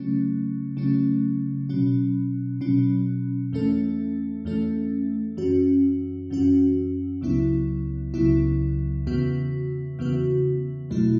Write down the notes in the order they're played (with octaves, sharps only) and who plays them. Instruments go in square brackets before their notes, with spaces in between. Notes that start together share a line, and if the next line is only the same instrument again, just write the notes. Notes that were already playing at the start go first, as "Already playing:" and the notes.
Already playing: [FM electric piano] C#3 F#3 A3 C#4
C#3 F#3 A3 C#4
B2 F#3 C#4
B2 F#3 C#4
E2 E3 A3 C#4 A4
E2 E3 A3 C#4 A4
F#2 E3 C#4 F#4
F#2 E3 C#4 F#4
C#2 C#3 F#3 B3 E4
C#2 C#3 F#3 B3 E4
E2 C#3 E3 B3 F#4
E2 C#3 E3 B3 F#4
E2 B2 F#3 A3 E4